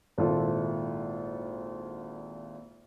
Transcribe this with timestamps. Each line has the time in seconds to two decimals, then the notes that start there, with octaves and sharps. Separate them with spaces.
0.18 G#1 A#2 E4 F4 A4